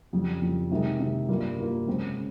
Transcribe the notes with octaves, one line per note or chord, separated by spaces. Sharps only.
F2 C#3 G3
F2 C#3 G3
C3 D#3 G#3 D#4
C3 D#3 G#3 D#4
G2 G3 A#3 F4
G2 G3 A#3 F4
C#3 G#3 C4
C#3